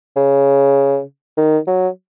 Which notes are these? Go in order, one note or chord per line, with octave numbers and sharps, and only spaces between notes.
C#3
D#3
F#3